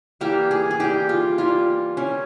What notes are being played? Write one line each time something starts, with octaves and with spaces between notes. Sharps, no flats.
E3 G3 A#3 G4
G#4
G#4
E3 G3 A#3 G4
F4
E3 G3 A#3 F4
E3 G3 A#3 C#4